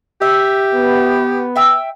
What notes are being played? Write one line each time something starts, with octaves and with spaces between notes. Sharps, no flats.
G4 E5
B3
E5 G5 E6